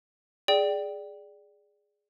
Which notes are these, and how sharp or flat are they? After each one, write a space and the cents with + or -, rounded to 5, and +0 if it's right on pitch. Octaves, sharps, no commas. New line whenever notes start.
G#4 +0 D5 +0 G5 -15